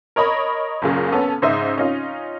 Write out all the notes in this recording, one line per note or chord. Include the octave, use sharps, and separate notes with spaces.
A#4 C#5 D#5 B5
F#1 A#2 C#3
B3 C#4 A4
G#2 C#3 D#4 C5 E5
C#4 D#4 F4